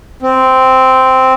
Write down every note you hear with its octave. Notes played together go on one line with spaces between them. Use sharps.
C4